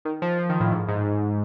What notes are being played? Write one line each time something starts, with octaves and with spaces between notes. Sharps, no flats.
D#3
F3
F3
D#3
A2
G#2
G#2